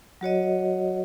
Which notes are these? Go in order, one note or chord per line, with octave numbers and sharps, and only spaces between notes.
F#3 F#4 C#5 D#5